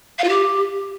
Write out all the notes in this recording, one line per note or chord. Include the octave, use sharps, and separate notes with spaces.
F5
F4
G4